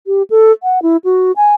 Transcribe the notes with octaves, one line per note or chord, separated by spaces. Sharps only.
G4
A4
F#5
E4
F#4
G#5